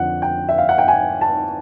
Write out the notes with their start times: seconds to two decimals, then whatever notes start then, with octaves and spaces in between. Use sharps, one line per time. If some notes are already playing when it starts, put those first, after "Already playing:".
Already playing: F2 D3 F3 F#5
0.22 G5
0.49 E5
0.58 F5
0.69 F#5
0.78 G5
0.88 G#5
1.21 A5